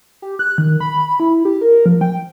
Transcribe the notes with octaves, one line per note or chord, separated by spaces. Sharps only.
G4
F#6
D#3
B5
E4
G4
A#4
F3
G5